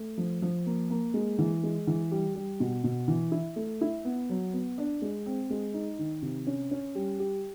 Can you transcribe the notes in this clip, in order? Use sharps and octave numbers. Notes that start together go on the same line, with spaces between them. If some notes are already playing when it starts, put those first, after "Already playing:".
Already playing: A3
F3
F3
A#3
A#3
G#3
E3
G#3
E3
G3
G3
B2
B2
E3
E4
A3
E4
B3
F#3
B3
D4
G#3
C4
G#3
D#4
D#3
C3
C#4
C#4
G3
G4